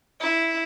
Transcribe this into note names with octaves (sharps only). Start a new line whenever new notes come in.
E4